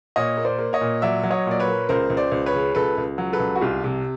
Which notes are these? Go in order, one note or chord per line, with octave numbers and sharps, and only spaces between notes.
A#2 C#5 D#5
A#3
C5 D5
A#3
C#5 D#5
A#2
F#3 D5 E5
F#3
C#5 D#5
A#2 D5
B4 C#5
A#3
C#2 A#4 C5
C#2
C5 D5
C#2
B4 C#5
C#3
C#2 A4 B4
C#2
F#3
A4 B4
C#2
F#4
C2 F4 G4
C3